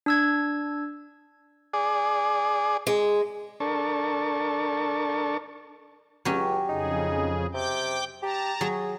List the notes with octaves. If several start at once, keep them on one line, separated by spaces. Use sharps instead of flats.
D4 E6 G#6
G#4 D5
G#3
D4 A4 A#4 D5 A5 C#6
C#2 F#3 C#4 G4
F2 C#3 D#4 G#4
C3 G5 D6 G6
G4 A5 A#5
F#3 G#4